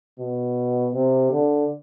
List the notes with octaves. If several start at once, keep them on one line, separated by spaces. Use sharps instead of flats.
B2
C3
D3